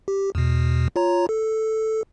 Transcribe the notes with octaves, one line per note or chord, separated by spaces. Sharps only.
G4
E2 B2
F4 C#5 A#5
A4